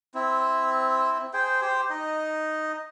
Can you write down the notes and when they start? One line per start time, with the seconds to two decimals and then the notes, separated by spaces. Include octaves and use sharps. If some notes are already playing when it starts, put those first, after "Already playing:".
0.15 C4 E4
1.33 G#4 C5 G5
1.62 G4 C5 G5
1.90 D#4 D#5